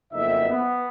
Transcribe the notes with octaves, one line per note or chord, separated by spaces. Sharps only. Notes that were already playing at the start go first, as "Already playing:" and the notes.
F#1 F2 B3 D#4 E5
B3